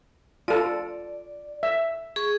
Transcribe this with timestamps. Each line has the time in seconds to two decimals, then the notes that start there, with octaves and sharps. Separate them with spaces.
0.48 F4 A4 D5
1.63 E5
2.16 G#4 C#6